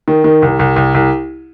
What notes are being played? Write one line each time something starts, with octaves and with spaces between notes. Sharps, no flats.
D#3
D#3
C2
C2
C2
C2